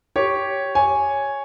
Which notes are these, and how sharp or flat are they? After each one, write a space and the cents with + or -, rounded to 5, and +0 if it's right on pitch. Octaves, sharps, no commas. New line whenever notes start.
G4 -5 C#5 +0
C#5 +0 G#5 +0